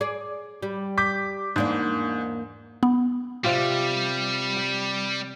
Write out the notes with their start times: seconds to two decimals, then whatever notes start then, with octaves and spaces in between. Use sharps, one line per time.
0.01 G#4 D5
0.63 G3
0.98 D6 G6 B6
1.56 E2 G#2 A#3 D4
2.83 B3
3.44 C3 G3 F4 G4
4.57 G5